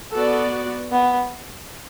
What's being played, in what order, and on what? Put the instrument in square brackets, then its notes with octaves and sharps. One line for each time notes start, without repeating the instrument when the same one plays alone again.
[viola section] B3 F#4 D5 [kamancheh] A4
[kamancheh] B3